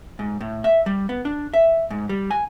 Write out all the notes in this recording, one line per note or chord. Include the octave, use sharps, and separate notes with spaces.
G#2
A2
E5
G3
B3
D4
E5
G#2
G3
G#5